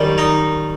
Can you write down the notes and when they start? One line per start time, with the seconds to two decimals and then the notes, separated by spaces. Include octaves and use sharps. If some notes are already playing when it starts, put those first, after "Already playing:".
Already playing: F#2 D#3 G3
0.18 D#4